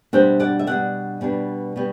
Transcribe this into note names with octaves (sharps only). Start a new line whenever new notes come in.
B2 G3 D4 C5 E5
D5 F#5
E5
B2 G3 D4 D5 F#5
B2 G3 D4
B2 G3